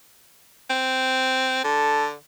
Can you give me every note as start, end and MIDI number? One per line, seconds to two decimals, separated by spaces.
0.70 1.64 60
1.64 2.13 50
1.64 2.07 69